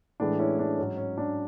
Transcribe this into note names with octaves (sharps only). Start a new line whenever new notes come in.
A2 E3 G#3 D4
C#4 E4
D4
G#2 F#3 C#4
C#4
D4